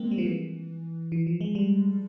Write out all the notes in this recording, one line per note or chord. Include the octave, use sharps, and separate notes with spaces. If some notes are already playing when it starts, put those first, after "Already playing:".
Already playing: G#3 A#3 C4
G3
F3
E3
E3
F3
G#3
G3